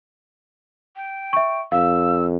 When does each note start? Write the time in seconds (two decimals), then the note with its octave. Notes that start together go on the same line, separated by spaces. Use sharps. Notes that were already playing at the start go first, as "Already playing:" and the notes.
0.96 G5
1.33 E5 C#6
1.72 F2 F5 E6